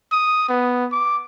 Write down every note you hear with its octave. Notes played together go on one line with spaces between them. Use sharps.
D#6
B3
D6